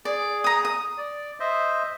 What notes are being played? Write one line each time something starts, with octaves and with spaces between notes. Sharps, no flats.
G#4 D5
A#5 D#6
D#6
D5
C5 D#5 E5